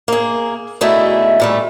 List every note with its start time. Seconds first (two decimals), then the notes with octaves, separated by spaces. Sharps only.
0.08 A#3 G#4
0.81 B2 D3 A3 D#4 E4 G#4
1.40 A#2 G3 A3